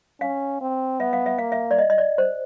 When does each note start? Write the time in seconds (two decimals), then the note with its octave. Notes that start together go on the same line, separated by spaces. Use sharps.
0.21 C#4 F5
0.61 C4
1.00 B3 E5
1.13 F5
1.26 E5
1.38 A#3 F5
1.52 E5
1.71 D5
1.78 D#5
1.90 D#5
1.98 D5
2.18 C5